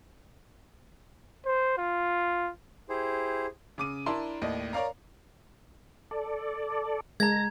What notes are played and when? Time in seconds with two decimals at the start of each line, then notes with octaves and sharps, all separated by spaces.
1.46 C5
1.78 F4
2.89 E4 G4 G#4 C5
3.78 C#3 D6 D#7
4.06 D4 E4 A#4 A5 C6
4.42 D#2 A2 D5 D#5
4.73 A#4 C#5 D5 F5 A#5
6.11 A4 D5
7.20 G#3 A5 A#5 G#6 A#6